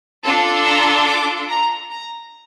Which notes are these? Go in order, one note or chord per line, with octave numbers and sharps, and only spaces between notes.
D4 F4 A4 A5
A#5
D6
A#5
A#5